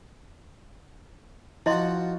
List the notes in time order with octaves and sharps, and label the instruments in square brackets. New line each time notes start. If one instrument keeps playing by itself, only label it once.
[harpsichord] F3 F#4 [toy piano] E4 D#5 C6